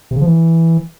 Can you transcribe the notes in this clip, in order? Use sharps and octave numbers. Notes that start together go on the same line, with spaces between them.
C3
C#3
F3
E3